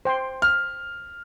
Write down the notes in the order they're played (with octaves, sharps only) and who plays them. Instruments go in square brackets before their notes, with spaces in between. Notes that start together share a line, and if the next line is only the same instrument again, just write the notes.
[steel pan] C5 G5 C6
[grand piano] F6